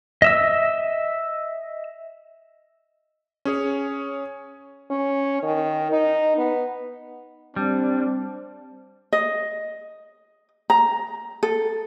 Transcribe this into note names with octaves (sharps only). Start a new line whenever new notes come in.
D#5 E5 E6
C#4 G#4 C#5
C#4
D#3
D#4
B3
G3 C4 D4
D#5
A#5
A4